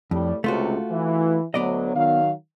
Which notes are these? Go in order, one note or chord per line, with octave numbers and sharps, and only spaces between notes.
F2 A2 G3
C#2 C3 A3 F4 F#4
E3
D2 F#3 B3 D5 D#5
D#3 F#3 F5